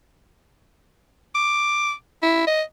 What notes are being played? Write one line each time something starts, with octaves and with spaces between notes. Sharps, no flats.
D6
E4
D#5